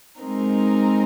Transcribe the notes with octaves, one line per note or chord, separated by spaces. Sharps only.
G#3 C4 D#4 A#4